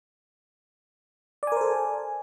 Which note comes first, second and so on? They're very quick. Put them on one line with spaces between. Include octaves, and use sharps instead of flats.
D5 G#5 A#4 C5 A4